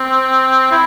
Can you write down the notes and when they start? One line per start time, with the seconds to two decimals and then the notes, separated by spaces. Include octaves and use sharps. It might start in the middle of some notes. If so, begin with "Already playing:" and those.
Already playing: C4
0.71 E4